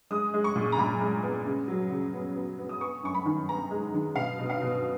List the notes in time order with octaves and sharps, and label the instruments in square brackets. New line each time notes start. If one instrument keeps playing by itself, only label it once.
[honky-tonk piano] G#3 D#6
G#3
C#6
A#2
A#5
A#2 B5
G#3
B3
C#3
F#3
C#3
B3
B3
B3
D#6
B3 C#6
F#2 C#6
B5
D#3
B3 A#5
G#3
D#3
B2 F5
B2
F5
B2